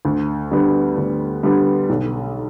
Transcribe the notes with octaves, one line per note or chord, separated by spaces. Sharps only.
D2
D3 G3 B3
D2
D3 G3 B3
B1